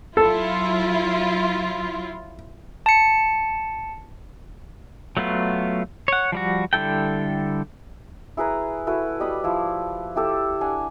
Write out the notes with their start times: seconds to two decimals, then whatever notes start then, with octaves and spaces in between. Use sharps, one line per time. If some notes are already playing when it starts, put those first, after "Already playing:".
0.17 F#3 E4 F4 A4
2.86 A5 C#7
5.17 F#3 A3 B3 F4
6.08 C#5 F#5
6.32 F3 G3 F#4
6.73 D3 G3 E4 A4 G5
8.37 E4 G#4 B4 A#5
8.87 E4 F#4 A4 B4
9.20 G3 D#5 B5 D#6
9.43 F3 E4 D5
10.16 E4 G4 A4
10.61 D4 F#5 G#5 A5